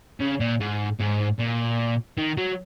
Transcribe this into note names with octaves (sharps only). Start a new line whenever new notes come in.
C#3
A#2
G#2
G#2
A#2
D#3
F#3